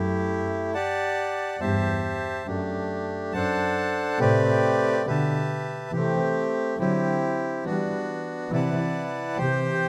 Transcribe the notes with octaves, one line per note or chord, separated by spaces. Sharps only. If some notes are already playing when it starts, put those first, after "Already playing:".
Already playing: F#2 A3 E4 G4
G4 D5 F#5 A5
E2 G2 G4 C5 E5 A5
F#2 A3 D4 G4
F#2 D4 A4 C5 F#5 A5
A2 C3 A3 C4 G4 B4 D5
B2 D3 G4 B4 E5 A5
C3 E3 A3 C4 G4
D3 F#3 C4 E4 G4
E3 G3 B3 D4 F#4
C3 E3 E4 B4 D5 F#5 A5
C3 E3 G4 C5 G5